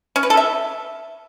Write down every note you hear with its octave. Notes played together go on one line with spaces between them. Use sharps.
C#4
B4
A4
E5